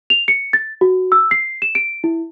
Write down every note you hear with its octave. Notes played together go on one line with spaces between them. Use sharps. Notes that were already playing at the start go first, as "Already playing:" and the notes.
F7
C#7
A6
F#4
E6
C7
E7
D7
E4